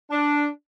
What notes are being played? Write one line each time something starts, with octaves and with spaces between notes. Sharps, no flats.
D4